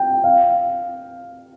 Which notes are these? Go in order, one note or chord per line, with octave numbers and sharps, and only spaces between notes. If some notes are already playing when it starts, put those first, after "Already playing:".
Already playing: G5
F5